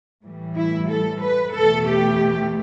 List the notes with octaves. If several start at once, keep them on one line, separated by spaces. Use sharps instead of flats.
A2 E3 G3
E4
A4
B4
E2 B2 A3 A4
G4